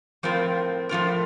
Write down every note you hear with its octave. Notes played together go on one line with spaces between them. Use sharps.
A2 F3 C4 F4 A#4
A2 F3 C4 F4 A#4